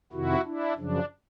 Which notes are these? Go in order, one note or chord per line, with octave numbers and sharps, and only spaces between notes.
F2 C3 D#3 E4 F#4
D4 E4
F#2 C#3 F3 D4